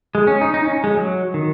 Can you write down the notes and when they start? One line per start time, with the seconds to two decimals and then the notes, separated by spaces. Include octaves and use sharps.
0.15 G#3
0.27 C#4
0.41 D#4
0.54 D#4
0.64 C#4
0.84 G#3
0.94 F#3
1.34 D#3